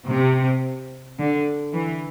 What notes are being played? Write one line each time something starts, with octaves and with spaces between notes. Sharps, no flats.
C3
D3
E3